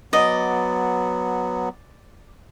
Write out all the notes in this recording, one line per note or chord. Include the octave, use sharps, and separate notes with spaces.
F#3 B3 D5 D#5